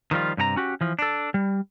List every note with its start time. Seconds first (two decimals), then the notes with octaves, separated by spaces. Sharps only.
0.11 D#3 F3 G3 F4
0.37 G2 C3 G4 A#5
0.56 C#4 F#4 G4
0.81 E3 F3
0.99 D4 A4
1.34 G3